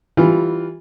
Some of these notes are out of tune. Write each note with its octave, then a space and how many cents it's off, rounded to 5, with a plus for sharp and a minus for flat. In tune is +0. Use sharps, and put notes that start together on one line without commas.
E3 +0 G3 -5 F4 +0